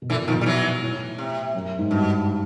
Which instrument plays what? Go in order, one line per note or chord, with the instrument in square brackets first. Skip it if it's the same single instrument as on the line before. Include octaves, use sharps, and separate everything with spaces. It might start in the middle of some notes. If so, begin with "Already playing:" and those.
[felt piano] B2
[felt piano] A#2 [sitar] D3 E3
[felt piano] B2
[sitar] D#3 F3
[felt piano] B2
[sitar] G3
E3 F#3
[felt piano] A2
[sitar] C3
[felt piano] F#2
G#2
[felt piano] G2 [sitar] B2